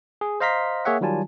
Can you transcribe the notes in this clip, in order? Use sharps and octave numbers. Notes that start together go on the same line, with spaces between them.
G#4
C5 D#5 F5 A#5 C6 B6
A#3 G#4 C#5 E5 F#5
D#3 F#3 G3 F4 G#5 A5